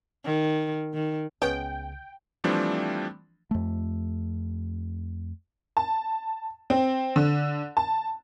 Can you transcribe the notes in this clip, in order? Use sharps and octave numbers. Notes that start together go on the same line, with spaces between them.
D#3
D#3
C#2 G#3 B3 C#4 G5
E3 F3 G3 A3 C4 D4
F2 A3
A5
C4
D3
A5